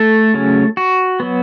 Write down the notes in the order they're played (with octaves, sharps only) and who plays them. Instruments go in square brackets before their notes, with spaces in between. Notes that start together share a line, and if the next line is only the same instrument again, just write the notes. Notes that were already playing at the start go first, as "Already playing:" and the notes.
Already playing: [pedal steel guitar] A3 A4
C#3 F#3 C#4
F#4
F#3 B3